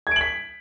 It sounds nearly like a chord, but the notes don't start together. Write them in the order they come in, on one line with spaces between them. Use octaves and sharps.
G#6 D7 F#7 B6